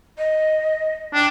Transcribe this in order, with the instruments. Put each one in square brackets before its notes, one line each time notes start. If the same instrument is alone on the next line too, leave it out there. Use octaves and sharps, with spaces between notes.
[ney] D#5
[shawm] D4 [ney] G5